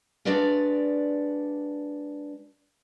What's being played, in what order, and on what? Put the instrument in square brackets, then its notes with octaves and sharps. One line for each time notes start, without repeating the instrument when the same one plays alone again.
[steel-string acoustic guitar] G#3 D4 F#4 B4 D5 F5